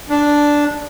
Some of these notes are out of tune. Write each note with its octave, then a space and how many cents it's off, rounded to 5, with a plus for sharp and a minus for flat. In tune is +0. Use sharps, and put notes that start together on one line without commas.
D4 -5